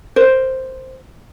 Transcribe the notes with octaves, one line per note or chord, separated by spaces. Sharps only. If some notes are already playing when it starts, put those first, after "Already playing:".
A#4 C5